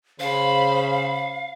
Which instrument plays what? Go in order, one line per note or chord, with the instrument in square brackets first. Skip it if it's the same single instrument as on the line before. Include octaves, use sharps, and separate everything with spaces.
[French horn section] C#3 [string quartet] C5 B5 [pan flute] F5